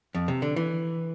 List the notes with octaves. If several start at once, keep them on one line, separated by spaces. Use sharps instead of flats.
F2
C3
D3
E3